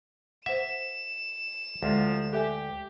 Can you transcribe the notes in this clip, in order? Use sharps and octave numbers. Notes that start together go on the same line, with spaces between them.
C5 E5 F#5 E7
D2 C3 F3 G#3
G4 A4 E5 G#5